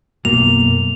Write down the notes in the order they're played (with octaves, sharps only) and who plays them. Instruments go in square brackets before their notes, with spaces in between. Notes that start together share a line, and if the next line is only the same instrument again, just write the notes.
[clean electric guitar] B1 F#2 A#3 [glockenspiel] F7